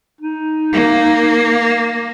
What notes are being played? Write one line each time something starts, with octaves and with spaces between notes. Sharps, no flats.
D#4
A#3